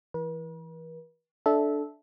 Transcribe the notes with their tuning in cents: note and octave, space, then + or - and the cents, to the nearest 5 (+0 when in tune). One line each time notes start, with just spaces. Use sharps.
E3 +0 B4 -45
D4 +0 A4 -10 E5 -15